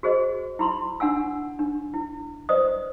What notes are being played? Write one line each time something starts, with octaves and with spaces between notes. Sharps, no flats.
F#4 G#4 C5 D#5
E4 B5 C6
D4 F#5 G#5 E6
D4
E4
B4 C5 D5 D#5 D#6